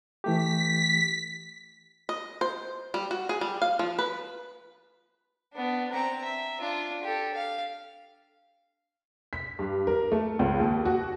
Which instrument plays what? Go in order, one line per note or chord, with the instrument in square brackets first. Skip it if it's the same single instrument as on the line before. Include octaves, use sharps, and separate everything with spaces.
[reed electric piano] E3 A3 G4 [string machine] B6
[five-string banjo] D#5
C5
G3
F#4
G#4
G3
F5
F3
B4
[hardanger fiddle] B3 D4
C4 A#5
E5
D4 F4
G4 A4
F5
[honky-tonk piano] B6
G2
A#4
A3
C#2
D#2
F#4